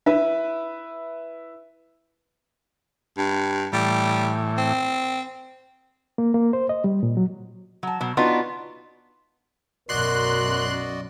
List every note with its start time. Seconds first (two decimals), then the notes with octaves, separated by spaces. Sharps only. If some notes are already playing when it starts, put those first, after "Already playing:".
0.06 E4 B4 E5
3.17 G2
3.73 A2 E3 G3
4.57 C4
6.18 A#3
6.34 A#3
6.53 C5
6.69 D#5
6.84 G3
7.03 A#2
7.17 F#3
7.83 F#3 A5
8.01 B2 F#3
8.17 B3 D4 D#4 F4 F#4
9.89 B1 F#2 F#4 A#4 D5 D#5 C6 F#6